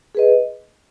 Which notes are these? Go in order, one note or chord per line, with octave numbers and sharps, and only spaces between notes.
G#4 B4 D#5